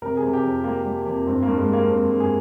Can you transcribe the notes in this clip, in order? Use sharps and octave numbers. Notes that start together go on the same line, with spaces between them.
C3 A#4
G#4
C3
G4
F2
G3 A#3
G3
F2
G2 C4
A#3
G2
G#3
G3
A#3
G2 C4
G2
G#4